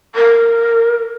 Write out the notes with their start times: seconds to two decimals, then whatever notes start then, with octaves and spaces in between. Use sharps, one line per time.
0.15 A#4